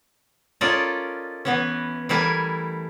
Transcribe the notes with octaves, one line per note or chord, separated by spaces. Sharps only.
C#4 F4 A4 A#4 D5 D#5
E3 B3 C#4
E3 G3 A3 E4 A#4 G#5